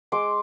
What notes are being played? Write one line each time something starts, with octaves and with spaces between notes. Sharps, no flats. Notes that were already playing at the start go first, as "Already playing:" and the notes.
G#3 C6 D6